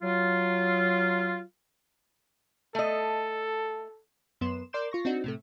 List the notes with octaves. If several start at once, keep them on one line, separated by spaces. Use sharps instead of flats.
F#3 F4
A3 A4 D#5
F#2 B3 C6 E7
A#4 D5 C6 D6 G6 E7
F4 C#6 A#6
C4 D4 D#4 F#4
A2 C3 A3